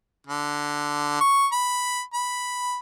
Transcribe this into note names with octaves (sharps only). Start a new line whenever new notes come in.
D3
C#6
B5
B5